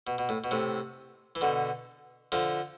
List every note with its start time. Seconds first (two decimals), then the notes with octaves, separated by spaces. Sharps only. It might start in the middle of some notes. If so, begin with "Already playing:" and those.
0.07 B2
0.18 B2
0.29 A2
0.44 B2
0.51 A2 C3
1.35 E3
1.41 B2 D3
2.32 D3 F3